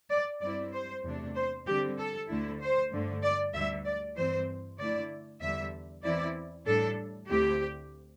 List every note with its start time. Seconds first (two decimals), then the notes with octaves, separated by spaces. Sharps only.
0.11 D5
0.42 G2 G3 C4 E4 D5
0.73 C5
1.04 E2 C3 A3 D4
1.35 C5
1.67 D3 G3 C4 G4
1.98 A4
2.29 D2 D3 A3 E4
2.61 C5
2.92 G2 D3 A3
3.23 D5
3.54 D2 D3 G3 E5
3.85 D5
4.16 G2 E3 C4 C5
4.79 D3 A3 E4 D5
5.41 E2 D3 G3 E5
6.03 E2 E3 C4 E4 D5
6.66 A2 G3 D4 A4
7.28 D2 D3 A3 C4 E4 G4